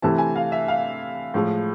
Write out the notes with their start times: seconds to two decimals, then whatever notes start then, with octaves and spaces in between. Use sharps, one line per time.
0.02 C3 E3 A3 C4 E4 A5
0.18 G#5
0.36 F5
0.52 E5
0.68 F5
1.34 A2 F3 G#3